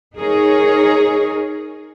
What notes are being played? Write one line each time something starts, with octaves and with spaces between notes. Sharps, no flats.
D#4 G#4 A#4 C#5